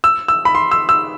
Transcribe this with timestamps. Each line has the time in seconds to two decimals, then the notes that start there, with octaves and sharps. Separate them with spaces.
0.04 E6
0.28 E6
0.45 B5
0.55 C6
0.71 E6
0.89 E6